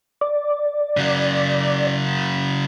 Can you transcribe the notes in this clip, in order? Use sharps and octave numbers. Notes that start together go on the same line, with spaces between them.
D5
C#3 F#3